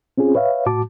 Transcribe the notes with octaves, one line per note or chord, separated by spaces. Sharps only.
C4 C#4 F4 G#4
B4 C#5 E5 F5
A2 F#4 A5 D6